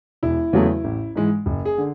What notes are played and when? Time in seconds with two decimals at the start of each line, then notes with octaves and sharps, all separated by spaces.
0.23 E1 E4
0.53 E2 C#3 F#3 A3
0.84 A1
1.15 G#2 E3 G#3
1.46 F#1
1.65 G#4
1.78 D3